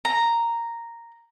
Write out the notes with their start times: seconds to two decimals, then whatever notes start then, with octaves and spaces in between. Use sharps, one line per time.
0.05 A#5